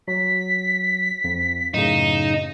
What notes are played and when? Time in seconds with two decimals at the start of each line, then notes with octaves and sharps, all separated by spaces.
0.08 F#3 B6
1.24 F2
1.74 F#2 A2 C#3 D#4 E7